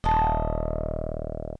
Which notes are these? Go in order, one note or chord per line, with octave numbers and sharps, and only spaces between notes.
D#1 D#5 A5